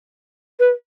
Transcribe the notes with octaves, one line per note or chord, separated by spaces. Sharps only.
B4